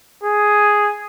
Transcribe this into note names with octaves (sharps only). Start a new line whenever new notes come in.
G#4